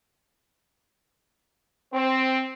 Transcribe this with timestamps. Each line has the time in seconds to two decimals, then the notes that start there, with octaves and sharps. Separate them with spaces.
1.93 C4